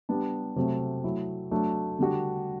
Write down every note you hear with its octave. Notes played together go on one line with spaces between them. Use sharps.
G3 B3 D4
C3 F#3 A3
F#3 A3 E4
F#3 A3 D4
D3 G3 D4 F#4